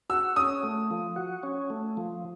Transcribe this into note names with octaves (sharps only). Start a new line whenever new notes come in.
F#4 E6
C#4 D#6
A3
F3
F#4
C#4
A3
F3